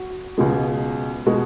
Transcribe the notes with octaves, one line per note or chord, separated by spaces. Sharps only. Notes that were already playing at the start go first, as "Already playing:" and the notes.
Already playing: F#4
C#2 B2 G#3
B2 G#3 F#4